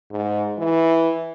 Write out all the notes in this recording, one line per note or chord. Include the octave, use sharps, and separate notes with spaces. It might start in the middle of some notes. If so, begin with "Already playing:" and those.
G#2
E3